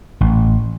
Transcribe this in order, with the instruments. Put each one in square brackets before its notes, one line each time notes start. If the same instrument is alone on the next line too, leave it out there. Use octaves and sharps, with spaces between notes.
[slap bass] A1